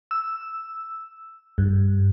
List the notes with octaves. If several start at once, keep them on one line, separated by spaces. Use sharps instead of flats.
E6
G2